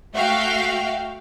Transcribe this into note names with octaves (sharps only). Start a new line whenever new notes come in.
A3 F#4 E5 F5 G5